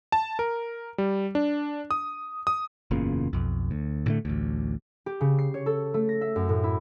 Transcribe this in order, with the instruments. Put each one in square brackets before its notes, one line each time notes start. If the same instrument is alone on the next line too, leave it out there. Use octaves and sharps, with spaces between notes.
[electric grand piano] A5
A#4
G3
D4
D#6
D#6
[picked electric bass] F#1 E2 A#2 C#3
B1 F2
D2
A2 D3 A3
A1 D2
[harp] G4
C#3
C7
C#5
A4
A3
A#6
E5
F#2
A2
E4